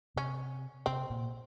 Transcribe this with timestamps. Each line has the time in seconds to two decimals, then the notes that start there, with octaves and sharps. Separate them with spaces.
0.16 C3 C#4
0.86 C3 C4
1.10 A#2